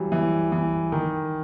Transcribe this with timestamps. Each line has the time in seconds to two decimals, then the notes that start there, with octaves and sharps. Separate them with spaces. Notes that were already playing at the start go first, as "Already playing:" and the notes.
Already playing: E3 F#3 G3
0.12 E3
0.52 E3
0.92 D#3